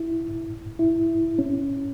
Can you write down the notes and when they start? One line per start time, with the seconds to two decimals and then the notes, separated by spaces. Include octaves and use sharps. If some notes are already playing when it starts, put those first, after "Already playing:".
Already playing: E4
0.79 E4
1.39 C#4